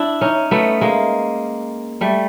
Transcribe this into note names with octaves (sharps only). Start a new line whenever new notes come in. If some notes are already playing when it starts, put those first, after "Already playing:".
Already playing: D4 E4
C#4 D#4
A3 B3
G#3 A#3
G3 A3